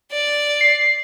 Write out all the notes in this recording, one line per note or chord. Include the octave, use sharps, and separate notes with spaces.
D5
C7